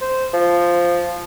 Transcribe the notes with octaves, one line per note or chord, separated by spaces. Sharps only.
C5
F3